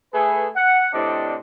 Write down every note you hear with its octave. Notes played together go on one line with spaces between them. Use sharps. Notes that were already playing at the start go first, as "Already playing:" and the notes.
A3 G#4 B4
F#5
A2 C3 C4 D4 D5 D#5